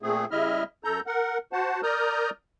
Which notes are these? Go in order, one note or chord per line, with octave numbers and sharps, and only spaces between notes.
A#2 A3 C4 G#4
C#3 G3 E4 D#5 E5 F6
F#2 A4 A#5 G6
A#4 F#5
F#4 C5 F#5 A5
A#4 D5 A#5 D#6 F6 G6